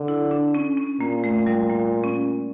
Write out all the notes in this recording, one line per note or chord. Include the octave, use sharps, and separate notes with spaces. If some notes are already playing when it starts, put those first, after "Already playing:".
Already playing: D3
E4
D4
C#4
C#4
A#2 A#3
A3
G3
A#3
C#4